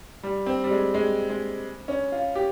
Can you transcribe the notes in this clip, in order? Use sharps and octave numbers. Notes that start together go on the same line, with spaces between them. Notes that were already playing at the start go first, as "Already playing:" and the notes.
G3
C4
G3
G#3
G#3
G#3
C#4
F4
G4